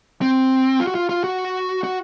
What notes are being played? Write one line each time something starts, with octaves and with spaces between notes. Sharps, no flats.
C4
F4
F#4
F4
F4
F#4
F#4